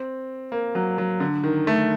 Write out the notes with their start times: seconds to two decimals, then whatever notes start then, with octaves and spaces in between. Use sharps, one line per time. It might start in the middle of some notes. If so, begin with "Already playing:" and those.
Already playing: C4
0.52 A#3
0.75 F#3
0.98 F#3
1.20 D3
1.44 D#3
1.67 A3